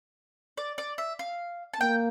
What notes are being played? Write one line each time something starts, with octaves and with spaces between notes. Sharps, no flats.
D5
D5
E5
F5
A5
A#3 G5